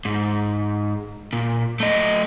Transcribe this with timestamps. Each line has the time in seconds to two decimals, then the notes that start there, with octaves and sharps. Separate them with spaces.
0.05 G#2
1.33 A#2
1.80 A3 D#5